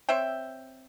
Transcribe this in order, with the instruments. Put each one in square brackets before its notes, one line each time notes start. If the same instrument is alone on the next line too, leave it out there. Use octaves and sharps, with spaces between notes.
[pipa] C4 C#5 E5 G5